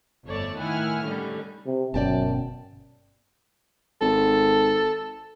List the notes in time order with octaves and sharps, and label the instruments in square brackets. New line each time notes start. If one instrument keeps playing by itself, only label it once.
[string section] G1 F2 A3 C#5 D5 A5
A2 D#3 E4 F#5 G#5 F6
A2 D3 D#3 G3 C#4
[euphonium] C3
[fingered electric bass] G1 B2 C#4 [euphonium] F#2 [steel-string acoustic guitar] D5 G5 A5
[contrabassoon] G#1 [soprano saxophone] A4